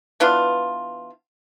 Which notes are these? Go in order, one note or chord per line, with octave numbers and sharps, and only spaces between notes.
E3 B3 D4 F4